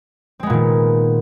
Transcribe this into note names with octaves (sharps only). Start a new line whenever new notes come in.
A#2 D#3 G#3 B3 C4